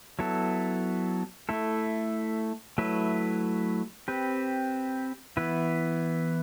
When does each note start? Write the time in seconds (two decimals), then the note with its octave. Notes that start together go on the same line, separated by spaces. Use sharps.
0.19 F#3 B3 E4 A4
1.49 A3 E4 A4
2.78 F#3 A3 E4 B4
4.08 C4 G4 B4
5.37 E3 B3 E4 B4